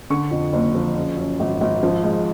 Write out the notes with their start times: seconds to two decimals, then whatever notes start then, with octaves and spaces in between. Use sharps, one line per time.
0.10 D3 C#6
0.31 F2
0.53 F#1
0.75 F3
0.97 C#3
1.17 F#2
1.40 G#1
1.61 G#1
1.83 F3
2.04 G#2